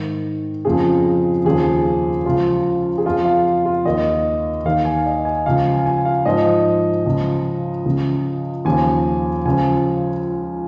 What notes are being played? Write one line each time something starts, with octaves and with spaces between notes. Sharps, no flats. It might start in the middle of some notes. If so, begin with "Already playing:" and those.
Already playing: G#2 D#3
F2 C#3 F3 G#4
D#2 C#3 F3 G#4
C#2 C#3 F3 F4
G#4
F2 F3 F4
F5
F4
D#2 D#3 D#5
D#2 D#3 F5
G#5
D#5
G#5
C#2 C#3 F3 F5
G#5
G#5
F5
G#2 F3 D#5
C#2 C#3 F3
C#2 C#3 F3
D#2 C#3 F3 G#5
C#2 C#3 F3 G#5